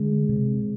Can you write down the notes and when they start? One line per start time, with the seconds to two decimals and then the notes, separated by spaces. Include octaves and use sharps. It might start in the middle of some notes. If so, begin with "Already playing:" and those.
Already playing: D3 G#3
0.29 C3